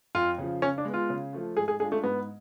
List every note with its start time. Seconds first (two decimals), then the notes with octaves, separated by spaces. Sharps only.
0.15 F2 F4
0.38 C#3 F3
0.62 C#3 C#4
0.78 D4
0.85 G#3 B3
0.94 F4
1.10 C#3
1.33 F3 A3 F4
1.57 G#2 G#4
1.68 G#4
1.80 G#3 D4 F4 G#4
1.92 A3
2.03 G#2 B3